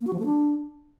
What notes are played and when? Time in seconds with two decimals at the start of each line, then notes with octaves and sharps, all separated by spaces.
0.01 A#3
0.07 F#4
0.13 F3
0.19 A3
0.25 D4